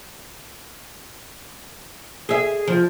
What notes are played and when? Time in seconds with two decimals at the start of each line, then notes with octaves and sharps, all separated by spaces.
2.29 G#4 E5
2.67 F3